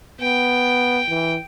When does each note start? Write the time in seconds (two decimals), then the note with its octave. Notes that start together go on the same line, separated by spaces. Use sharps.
0.20 B3 G5
1.09 E3